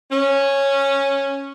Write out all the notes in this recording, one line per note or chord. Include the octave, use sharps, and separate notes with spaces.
C#4